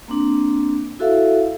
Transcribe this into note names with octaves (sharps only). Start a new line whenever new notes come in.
A#3 C4 D4
E4 F#4 A4 E5 F5